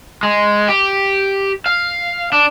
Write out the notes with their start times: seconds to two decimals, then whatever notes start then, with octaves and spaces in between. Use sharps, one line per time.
0.23 G#3
0.68 G4
1.66 F5
2.32 D4